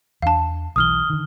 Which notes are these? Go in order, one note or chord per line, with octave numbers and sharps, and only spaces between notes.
E2 D4 F5 A5
B1 D#3 E3 D#6 F6 G7
D3 D#3